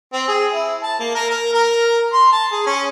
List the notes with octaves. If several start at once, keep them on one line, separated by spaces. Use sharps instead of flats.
C4
G#4
E4
A5
A#3
A#4
A#4
A#4
C6
A5
G#4
C#4